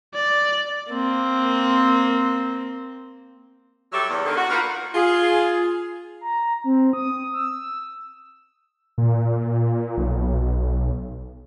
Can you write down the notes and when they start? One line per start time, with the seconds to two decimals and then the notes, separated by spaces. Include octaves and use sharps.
0.14 D5
0.91 A#3 C4
3.92 F#3 G3 G4 A4 C#5 E5
4.08 E2
4.25 D3 D#3
4.36 F#4
4.50 A#3 D#4 F4 F#4 B4 F5
4.95 F4 G#4
6.21 A#5
6.64 C4
6.93 D#6
7.34 E6
8.98 A#2
9.97 B1